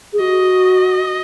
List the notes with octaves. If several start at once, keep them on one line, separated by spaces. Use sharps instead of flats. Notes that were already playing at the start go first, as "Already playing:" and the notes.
G#4
F#4 D#5